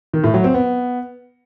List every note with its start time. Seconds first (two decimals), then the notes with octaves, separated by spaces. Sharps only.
0.14 D#3
0.24 A2
0.34 F#3
0.44 C4
0.54 B3